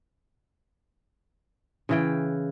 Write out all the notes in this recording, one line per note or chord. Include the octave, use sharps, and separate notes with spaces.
C#3 E3 G5